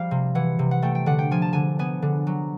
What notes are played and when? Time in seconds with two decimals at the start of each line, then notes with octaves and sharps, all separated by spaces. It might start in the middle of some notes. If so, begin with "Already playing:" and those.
Already playing: F3 G3 F5
0.11 C3
0.35 E3 F#5
0.59 C3
0.71 F#5
0.82 A3 G5
0.95 G5
1.06 D3 F#5
1.19 G5
1.31 F3 G#5
1.42 A5
1.53 D3 G#5
1.79 B3 G#5
2.02 D3
2.27 F#3